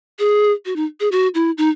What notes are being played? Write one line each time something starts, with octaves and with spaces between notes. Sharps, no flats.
G#4
F#4
D#4
G#4
F#4
E4
D#4